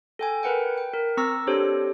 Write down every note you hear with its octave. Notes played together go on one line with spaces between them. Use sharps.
A4 G5 G#5
A#4 B4 F#5 G5
G5
A#4
C4 A#5 C#6 E6 A#6
D4 G4 A4 C5 C#5